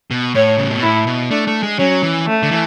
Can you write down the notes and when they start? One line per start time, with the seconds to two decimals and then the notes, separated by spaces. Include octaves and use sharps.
0.11 B2
0.35 A2 C#5
0.58 C#3
0.70 B2
0.83 A2 E4
1.07 B2
1.31 A3 D4
1.47 A3
1.63 G#3
1.78 F#3 C#4
2.03 E3
2.27 A3
2.43 D3
2.51 E3